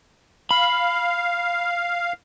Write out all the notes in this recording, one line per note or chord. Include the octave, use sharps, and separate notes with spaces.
F5 B5